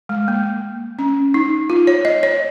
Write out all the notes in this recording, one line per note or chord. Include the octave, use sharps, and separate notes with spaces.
G#3
A#3
C#4
D#4
F4
C#5
D#5
C#5